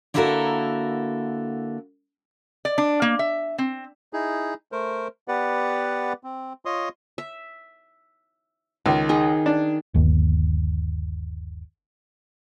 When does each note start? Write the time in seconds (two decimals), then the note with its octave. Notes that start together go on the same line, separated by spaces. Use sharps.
0.14 D3 A#3 E4 F#4 A4 A#4
2.65 D5
2.78 D4
3.02 A#3
3.19 E5
3.58 C4
4.13 D#4 E4 G#4
4.72 A3 A#4 C5
5.28 B3 G4 B4 D5 F#5
6.24 C4
6.65 F4 C#5 D#5 C6 D#6
7.18 E5
8.86 C#2 D#3
9.09 D#4 G#4
9.46 D4
9.94 G1 D#2